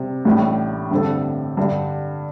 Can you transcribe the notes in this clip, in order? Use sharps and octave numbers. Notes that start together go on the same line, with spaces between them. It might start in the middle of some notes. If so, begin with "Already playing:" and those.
Already playing: C3 G3 C4
A1 A2 G3 D4 G4
G2 D3 C4 A4
G2 D3 G3